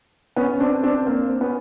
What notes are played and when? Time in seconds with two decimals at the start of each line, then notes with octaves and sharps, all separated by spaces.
0.36 B3 C#4
0.60 C4 D4
0.83 C4 D4
1.07 A#3 C4
1.41 B3 C#4